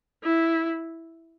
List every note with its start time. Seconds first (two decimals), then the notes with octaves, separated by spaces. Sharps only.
0.23 E4